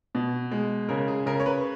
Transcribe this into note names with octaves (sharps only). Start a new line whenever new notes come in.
B2
G#3
C#3 A#4
G#4
C#3 A#4
C#5
B4